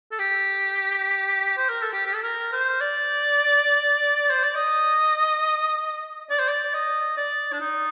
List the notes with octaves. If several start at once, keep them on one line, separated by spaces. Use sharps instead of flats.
A4
G4
C5
A#4
A4
G4
G4
A4
A#4
C5
D5
C5
D5
D#5
D5
C5
D5
D#5
D5
D4
D#4